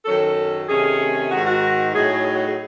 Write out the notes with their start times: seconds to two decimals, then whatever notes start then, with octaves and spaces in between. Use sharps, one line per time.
0.05 F#2 D#3 F#3 C#4 A4
0.68 C3 D#3 A3 C#4 G#4
1.31 G#2 D#3 G#3 F#4
1.46 F#4
1.93 A2 F#3 A3 D#4 G#4
2.25 G#4
2.35 F#4
2.46 G#4